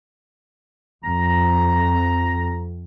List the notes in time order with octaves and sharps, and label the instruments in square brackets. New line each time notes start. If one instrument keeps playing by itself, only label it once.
[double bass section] F2 [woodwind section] A#5